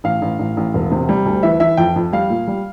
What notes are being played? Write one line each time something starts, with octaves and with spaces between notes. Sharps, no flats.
A1 F5
A1
A1
A1
E1
C3
G3
D2
E3 E5
E3 E5
F2 G5
F2
G3 F5
A#2
G3